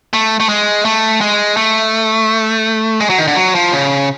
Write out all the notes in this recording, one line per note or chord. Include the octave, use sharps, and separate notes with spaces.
A3
A3
G#3
A3
G#3
A3
G#3
F#3
D#3
D3
F#3
F3
C#3